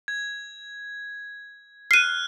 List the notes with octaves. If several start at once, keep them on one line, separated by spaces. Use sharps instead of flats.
G#6
F6 F#6 C7 D#7